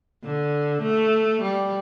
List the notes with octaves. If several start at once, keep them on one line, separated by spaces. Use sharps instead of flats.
D3
A3
G3